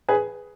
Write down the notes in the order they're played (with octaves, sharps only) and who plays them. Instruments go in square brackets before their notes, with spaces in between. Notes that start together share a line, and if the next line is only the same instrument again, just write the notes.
[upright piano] G#4 B4